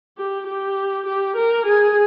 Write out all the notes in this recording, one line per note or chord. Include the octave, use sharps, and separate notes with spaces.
G4
G4
G4
A#4
G#4